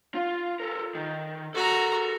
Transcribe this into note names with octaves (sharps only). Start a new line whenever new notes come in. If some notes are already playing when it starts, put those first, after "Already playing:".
F4
A4 A#4
D#3
F#4 A4 A#4 A#5